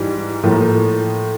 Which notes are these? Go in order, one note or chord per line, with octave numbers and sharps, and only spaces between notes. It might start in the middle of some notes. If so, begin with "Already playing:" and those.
Already playing: G#2 E3 G3
A2 F3 A#3